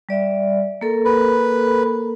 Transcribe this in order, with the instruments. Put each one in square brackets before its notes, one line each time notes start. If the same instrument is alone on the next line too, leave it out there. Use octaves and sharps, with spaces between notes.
[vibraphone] G3 D5 E5
A#3 A4 A#4
[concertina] B4